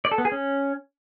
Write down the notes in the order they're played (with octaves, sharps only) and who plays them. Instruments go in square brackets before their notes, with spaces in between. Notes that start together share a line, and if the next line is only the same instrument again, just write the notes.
[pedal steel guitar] D5
A4
B3
G#4
C#4